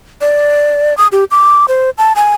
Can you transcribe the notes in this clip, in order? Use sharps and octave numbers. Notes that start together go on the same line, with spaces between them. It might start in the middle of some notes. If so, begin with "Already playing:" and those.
D5
D#6
G4
D6
C5
A5
G#5